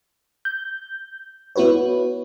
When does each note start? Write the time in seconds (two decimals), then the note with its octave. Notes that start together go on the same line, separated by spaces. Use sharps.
0.45 G6
1.56 B3 E4 F#4 B4 C#5